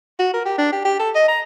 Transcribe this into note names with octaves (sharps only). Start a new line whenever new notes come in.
F#4
A#4
G4
D4
G4
G4
A4
D#5
A#5